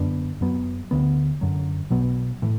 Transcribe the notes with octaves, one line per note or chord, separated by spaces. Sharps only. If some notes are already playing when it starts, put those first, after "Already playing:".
Already playing: F#2 D3 B3 D4
F#2 F#3 B3
D2 D3 B3
F#2 D3 F#3
B1 B2 F#3 B3
A2 E3